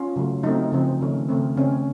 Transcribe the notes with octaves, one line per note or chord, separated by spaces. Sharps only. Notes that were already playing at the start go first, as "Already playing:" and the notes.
Already playing: C#4 F4
C#3 F#3 A3
F#3 A3 C4 D#4
C#3 F3 C4
D#3 A3 C#4
C#3 A3 C4
C#3 A3 C4 C#4